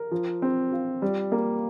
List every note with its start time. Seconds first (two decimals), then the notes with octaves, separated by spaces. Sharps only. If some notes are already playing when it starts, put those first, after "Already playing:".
Already playing: A#4
0.12 F3
0.42 C4
0.72 F4
1.02 G3
1.32 A#3